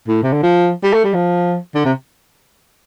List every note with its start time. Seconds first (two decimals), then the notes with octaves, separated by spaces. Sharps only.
0.08 A2
0.23 C3
0.33 D3
0.43 F3
0.84 G3
0.93 A3
1.04 G3
1.14 F3
1.75 D3
1.85 C3